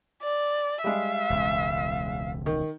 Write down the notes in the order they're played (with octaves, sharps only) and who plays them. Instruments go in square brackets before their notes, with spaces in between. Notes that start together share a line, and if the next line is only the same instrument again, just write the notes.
[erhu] D5
[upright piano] G3 G#3 [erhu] E5 [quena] F5
[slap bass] E1 C#2
[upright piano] D#3